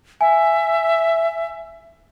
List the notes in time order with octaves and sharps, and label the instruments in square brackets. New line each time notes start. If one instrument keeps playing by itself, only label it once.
[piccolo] E5 [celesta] G#5